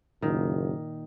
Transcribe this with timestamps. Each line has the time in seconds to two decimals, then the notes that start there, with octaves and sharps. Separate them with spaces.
0.22 F#1 A#2 D#3